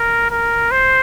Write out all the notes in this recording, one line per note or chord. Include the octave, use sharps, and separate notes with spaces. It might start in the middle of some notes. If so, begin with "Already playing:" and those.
Already playing: A#4
A#4
C5